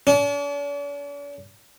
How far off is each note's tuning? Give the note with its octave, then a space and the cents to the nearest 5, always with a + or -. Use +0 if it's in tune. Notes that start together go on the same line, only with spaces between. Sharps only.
D4 -45